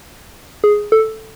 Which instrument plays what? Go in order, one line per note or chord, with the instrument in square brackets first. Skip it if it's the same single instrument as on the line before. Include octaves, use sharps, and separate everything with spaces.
[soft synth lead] G#4
A4